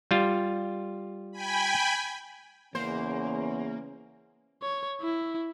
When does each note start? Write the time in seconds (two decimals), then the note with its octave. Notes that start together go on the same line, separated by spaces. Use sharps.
0.11 G3 F4
1.32 G5 G#5 B5
2.75 E2 C#3 A#3 B3 C#4 C5
4.62 C#5
5.02 E4